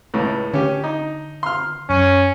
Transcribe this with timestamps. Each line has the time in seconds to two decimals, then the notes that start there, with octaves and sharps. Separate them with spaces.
0.14 C#2 A2
0.54 D3 C#4 G4
0.84 D#4
1.43 C6 F6
1.90 F#2 C#4